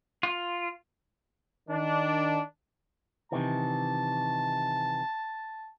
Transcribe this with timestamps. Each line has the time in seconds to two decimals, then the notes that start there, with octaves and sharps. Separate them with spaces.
0.23 F4
1.69 D#3 D4
3.32 C3 D#3 E3 A5